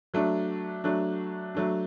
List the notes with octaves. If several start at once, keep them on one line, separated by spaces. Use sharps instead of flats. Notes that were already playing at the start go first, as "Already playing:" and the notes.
F#3 A3 D4
F#3 A3 D4
F#3 A3 D4